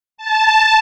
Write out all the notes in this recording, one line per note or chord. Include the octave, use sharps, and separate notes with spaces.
A5